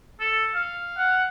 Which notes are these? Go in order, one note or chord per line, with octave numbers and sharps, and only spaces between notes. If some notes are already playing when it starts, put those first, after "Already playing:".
A4
F5
F#5